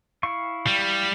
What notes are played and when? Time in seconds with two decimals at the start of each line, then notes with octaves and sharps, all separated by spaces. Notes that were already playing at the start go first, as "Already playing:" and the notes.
0.23 E4 F5 C#6
0.67 G3